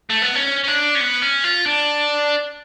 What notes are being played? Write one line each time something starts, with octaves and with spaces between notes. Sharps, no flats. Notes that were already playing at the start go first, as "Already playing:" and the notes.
A3
B3
C#4
C#4
D4
C#4
B3
C#4
F4
D4